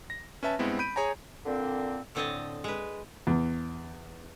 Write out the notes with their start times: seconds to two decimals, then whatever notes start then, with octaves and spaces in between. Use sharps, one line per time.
0.10 A#6
0.43 C#4 B4 E5 A5
0.59 G2 G#3 B3 C4 E4
0.79 B5 G6 D7 D#7
0.96 G#4 C#5 G#5 A#5
1.46 A#2 D3 C4
2.15 A2 D3 C4 C#5 D#5 A5
2.64 G#3 B4
3.27 E2